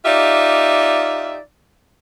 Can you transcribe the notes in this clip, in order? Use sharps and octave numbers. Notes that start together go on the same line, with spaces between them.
D#4 F4 G4 D5 E5